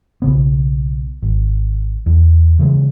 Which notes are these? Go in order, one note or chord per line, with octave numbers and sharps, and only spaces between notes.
B1 C#3 B3
G#1
E2
C#3 E3 G3 G#3